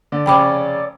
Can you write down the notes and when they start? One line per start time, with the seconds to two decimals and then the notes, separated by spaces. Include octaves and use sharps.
0.12 D3 D5
0.26 F1 C#3 C#4 G5 B5 D6